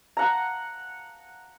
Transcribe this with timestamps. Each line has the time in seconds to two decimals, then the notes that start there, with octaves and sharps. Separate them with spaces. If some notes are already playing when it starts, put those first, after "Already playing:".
0.17 F#5 A#5